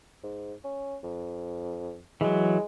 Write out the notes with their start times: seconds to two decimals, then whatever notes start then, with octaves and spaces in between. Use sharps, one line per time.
0.23 G#2
0.64 C#4
1.03 F2
2.21 E3 F#3 G#3